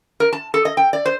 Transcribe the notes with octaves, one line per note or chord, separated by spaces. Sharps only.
A#4
A5
A4
D#5
G5
D5
C5